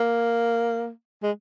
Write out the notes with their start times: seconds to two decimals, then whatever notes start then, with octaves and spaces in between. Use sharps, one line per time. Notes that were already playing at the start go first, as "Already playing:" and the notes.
Already playing: A#3
1.23 G#3